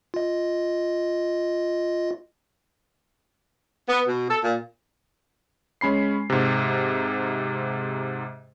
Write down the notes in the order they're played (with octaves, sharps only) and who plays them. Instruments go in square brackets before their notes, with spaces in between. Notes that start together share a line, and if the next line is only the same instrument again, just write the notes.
[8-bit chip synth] F4 D#5
[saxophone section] B3
B2
A4
A#2
[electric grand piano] G#3 C#4 B5 C7
G#2 C3